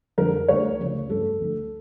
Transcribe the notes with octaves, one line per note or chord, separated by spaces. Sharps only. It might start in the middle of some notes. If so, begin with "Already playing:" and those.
F2 D3 G3 A#4
D2 D3 G3 C#5
D2 C#3 F3
G2 F3 A3 A4
D2 D3 F3 A3